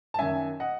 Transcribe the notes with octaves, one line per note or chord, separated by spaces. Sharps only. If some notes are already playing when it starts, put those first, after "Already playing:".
A5
F#2 D#3 E5 G#5
D#5 F#5